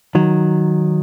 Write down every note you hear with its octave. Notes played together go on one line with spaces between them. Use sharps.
D#3 F#3